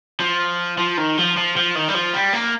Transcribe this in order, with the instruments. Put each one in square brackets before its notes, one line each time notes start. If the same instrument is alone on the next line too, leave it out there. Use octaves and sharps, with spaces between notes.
[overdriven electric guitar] F3
F3
D#3
F3
F3
F3
D#3
G3
F3
G3
A#3